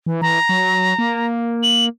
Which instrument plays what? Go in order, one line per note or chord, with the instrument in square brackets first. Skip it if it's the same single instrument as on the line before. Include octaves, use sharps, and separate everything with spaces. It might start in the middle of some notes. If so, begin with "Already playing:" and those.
[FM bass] E3
[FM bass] E3 [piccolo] A#5
[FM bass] F#3
A#3
[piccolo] F#7